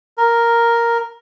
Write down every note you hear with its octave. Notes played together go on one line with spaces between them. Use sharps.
A#4